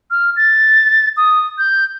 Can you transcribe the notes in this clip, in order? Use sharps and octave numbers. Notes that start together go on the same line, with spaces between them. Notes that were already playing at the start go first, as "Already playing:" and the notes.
F6
A6
D#6
G6